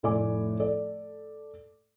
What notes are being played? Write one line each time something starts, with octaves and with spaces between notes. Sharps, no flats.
F1 A2 D5 G#5 D6
A4 D5